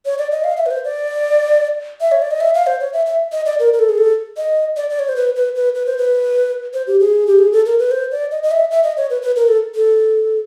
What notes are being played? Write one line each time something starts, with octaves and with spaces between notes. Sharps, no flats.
C#5
D5
D#5
F5
E5
B4
C5
D5
E5
C#5
D5
D#5
E5
F5
C5
C#5
E5
E5
D#5
D5
A#4
A#4
A4
G#4
A4
D#5
D5
D5
C#5
C5
B4
B4
B4
B4
C5
B4
C5
G4
G#4
G4
G#4
A4
A#4
B4
C5
D5
D#5
D#5
E5
E5
D#5
C#5
B4
B4
A#4
A4
A4